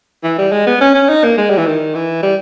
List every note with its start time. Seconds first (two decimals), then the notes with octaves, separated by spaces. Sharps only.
0.23 E3
0.38 G3
0.52 G#3
0.67 B3
0.81 C#4
0.95 C#4
1.09 D#4
1.24 A#3
1.37 G#3
1.50 G3
1.58 E3
1.66 D#3
1.95 E3
2.22 G3